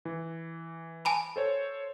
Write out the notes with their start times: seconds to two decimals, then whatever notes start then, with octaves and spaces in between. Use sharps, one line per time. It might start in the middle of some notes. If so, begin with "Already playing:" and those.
0.05 E3
1.05 G#5 A5 B5
1.36 A4 C5 C#5